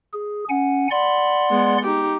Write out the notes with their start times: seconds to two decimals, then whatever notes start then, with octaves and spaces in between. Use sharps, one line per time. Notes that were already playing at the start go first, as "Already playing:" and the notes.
0.13 G#4
0.49 C#4 F#5 G#5
0.91 D5 F#5 B5 C6
1.51 G#3 B3
1.83 D#4 G4